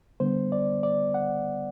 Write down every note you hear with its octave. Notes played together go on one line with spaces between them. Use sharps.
D3 G3 B3 C5
D5
D5
F#5